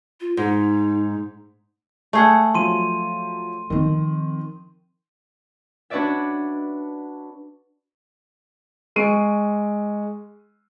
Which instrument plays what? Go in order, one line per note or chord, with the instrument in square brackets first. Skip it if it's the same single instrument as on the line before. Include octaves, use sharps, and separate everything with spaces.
[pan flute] F4
[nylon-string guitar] G#2 [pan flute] D#4
[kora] A3 G#4 F#5
[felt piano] F3 F#3 [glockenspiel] C6 D#7
[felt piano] D#3 [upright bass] F3 C4
[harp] D4 F#4 B4 C#5 D5 E5
[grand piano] G#3 C#6 C7 D7 D#7